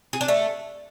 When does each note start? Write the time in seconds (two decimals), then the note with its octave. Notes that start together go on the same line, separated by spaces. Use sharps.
0.13 G#4
0.21 D4
0.28 A3